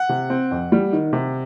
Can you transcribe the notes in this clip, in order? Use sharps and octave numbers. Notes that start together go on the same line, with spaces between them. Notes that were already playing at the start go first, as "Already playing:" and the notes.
Already playing: F#5
C3
C4
F2
G3
D#3
C3